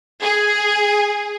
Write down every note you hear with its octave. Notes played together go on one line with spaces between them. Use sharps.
G#4